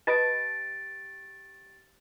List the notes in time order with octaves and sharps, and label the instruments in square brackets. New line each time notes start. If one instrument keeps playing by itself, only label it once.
[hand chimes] G4 A6 D7 [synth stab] B4 D#5 A5